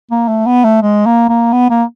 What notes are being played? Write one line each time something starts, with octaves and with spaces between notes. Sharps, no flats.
A#3
A3
B3
A3
G#3
A#3
A#3
B3
A#3